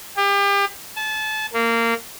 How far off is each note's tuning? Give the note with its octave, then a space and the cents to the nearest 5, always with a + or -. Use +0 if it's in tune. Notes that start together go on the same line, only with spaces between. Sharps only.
G4 +35
A5 -30
A#3 -20